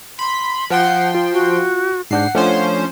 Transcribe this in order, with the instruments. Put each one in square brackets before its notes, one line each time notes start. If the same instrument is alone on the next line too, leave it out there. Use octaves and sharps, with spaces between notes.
[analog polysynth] B5 [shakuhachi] C6
[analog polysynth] F3 G5 C6 [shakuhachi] F#5
[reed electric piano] F4
[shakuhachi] F#4
[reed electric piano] G#2 D4 G6 [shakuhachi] F#5 [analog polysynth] C7
[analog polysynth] F3 C#4 C5 [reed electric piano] A3 D4